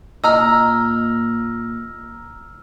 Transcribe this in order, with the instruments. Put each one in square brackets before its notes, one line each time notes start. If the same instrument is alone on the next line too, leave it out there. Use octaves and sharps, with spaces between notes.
[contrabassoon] A#2 [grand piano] D#5 A#5 [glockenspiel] E6 F6